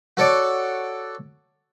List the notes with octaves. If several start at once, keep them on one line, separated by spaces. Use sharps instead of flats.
F#4 A4 C#5 D5